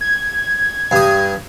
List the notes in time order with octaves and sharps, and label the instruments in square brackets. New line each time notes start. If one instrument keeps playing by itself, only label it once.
[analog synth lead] G#6
[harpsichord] G2 D#6